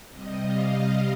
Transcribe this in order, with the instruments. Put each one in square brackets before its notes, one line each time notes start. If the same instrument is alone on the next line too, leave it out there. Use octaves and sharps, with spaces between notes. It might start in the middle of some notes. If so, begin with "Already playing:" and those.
[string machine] C3 G3 D#5
F5
D#5